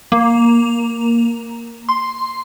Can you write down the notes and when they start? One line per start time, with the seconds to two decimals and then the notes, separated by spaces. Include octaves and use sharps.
0.12 A#3
1.89 C6